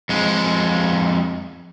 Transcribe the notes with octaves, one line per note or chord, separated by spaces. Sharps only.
F2 G#3